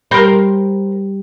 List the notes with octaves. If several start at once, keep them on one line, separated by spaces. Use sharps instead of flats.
G3 G4 A#4 C5 B5